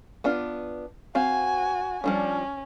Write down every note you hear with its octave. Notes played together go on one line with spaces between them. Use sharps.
B3 D4 F4
C4 F#4 C5 F5 G#5
F3 G3 C#4 D4